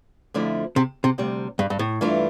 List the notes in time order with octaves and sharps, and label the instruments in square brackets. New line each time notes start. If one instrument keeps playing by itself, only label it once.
[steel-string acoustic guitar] F2 D3 F3 A3 E4
[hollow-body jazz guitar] C3
C3
[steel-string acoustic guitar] D2 C3 G3
[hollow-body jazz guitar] G2
G2
A2
[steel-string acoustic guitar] G2 E3 A3 D4 F4